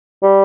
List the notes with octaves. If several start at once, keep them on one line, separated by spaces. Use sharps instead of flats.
G3